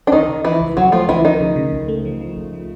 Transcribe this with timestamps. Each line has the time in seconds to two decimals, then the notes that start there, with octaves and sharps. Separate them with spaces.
0.07 D4
0.12 C#2 D#3 D#4
0.28 C#3
0.44 E3 F3 E4
0.61 C#2
0.77 C#2 F#3 F#4
0.92 F3 A3 F4
1.08 C#2 E3 E4
1.25 D#3 F3 D#4
1.40 C#3
1.56 C#3
1.73 C#2
1.88 A3
2.05 F3
2.21 F3
2.36 C#2
2.53 F3